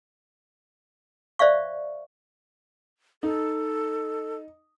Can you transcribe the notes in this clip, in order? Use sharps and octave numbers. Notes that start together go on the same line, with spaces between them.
C5 D5 E5 F5 C#6
D#4 A4